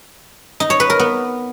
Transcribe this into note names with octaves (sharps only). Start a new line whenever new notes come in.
D#4
C#5
B4
A#4
B3